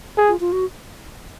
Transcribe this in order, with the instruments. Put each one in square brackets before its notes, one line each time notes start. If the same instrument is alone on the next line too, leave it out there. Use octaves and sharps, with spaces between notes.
[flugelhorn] G#4
[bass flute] F4
F4
F#4